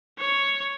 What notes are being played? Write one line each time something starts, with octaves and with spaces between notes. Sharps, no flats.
C#5